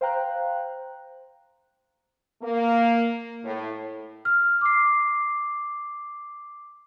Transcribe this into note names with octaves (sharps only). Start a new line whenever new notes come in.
C5 F5 G5 A#5 F#6
A#3
A2
F6
D6 C7